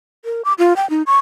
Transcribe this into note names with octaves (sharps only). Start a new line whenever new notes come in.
A#4
D6
F4
G5
D#4
C#6